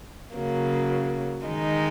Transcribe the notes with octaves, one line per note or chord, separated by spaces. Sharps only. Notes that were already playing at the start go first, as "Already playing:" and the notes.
C#3 F#3 A#3
D#3 G#3 D#4